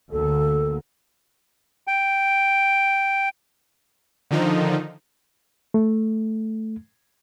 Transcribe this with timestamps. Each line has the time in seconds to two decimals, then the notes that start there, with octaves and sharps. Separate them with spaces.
0.12 D2 D3 A#3 A4
1.87 G5
4.31 D3 D#3 F3 D#4
5.74 A3